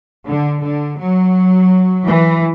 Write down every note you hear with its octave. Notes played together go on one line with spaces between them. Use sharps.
D3
D3
F#3
E3